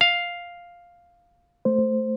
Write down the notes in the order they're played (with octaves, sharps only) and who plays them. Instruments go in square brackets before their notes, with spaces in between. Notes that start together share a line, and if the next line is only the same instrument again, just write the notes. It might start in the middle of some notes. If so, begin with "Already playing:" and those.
[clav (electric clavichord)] F5
[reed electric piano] A3 C5